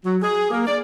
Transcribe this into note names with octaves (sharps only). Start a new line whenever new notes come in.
F#3
G#4
A#3
D5